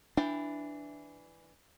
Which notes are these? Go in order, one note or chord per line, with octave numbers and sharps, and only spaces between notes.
E3 D4 E4 G5